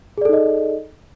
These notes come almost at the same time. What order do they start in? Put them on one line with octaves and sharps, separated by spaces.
G#4 D5 A4 D#4 D#5